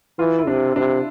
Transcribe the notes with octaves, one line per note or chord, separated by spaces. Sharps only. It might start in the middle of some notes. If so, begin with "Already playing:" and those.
E3 F4
E4
C3 D4
C3 D4